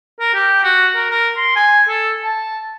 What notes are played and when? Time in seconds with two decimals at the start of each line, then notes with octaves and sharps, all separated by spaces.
0.20 A#4
0.34 G4
0.64 F#4
0.96 A#4
1.10 A#4
1.37 C6
1.56 G#5
1.88 A4
2.24 A5